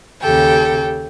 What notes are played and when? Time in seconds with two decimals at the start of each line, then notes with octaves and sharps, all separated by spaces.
0.22 D#2 C#3 G4 A4 G5